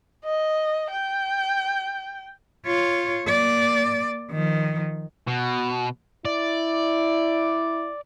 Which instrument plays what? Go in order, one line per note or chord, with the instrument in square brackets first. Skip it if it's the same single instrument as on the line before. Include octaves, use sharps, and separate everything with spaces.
[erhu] D#5
G5
[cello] F4 C#5
A#3 D5
D#3 F3
[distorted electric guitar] B2
[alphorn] E4 [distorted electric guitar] D5